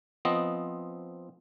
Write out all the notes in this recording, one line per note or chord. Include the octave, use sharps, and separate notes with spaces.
F3 B3 C4 D#5